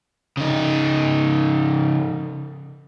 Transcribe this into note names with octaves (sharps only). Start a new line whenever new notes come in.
C#3 D#4